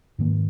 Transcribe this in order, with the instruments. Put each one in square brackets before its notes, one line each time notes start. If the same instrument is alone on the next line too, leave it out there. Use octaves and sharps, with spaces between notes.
[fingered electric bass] G#2 D#3 A#3